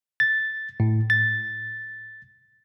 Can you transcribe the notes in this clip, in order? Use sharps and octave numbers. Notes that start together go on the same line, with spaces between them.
A6
A2
A6